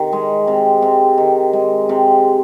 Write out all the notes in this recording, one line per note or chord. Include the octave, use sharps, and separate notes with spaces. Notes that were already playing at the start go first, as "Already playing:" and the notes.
Already playing: C3 D#3
G#3
C3
C3
D#3
G#3
C3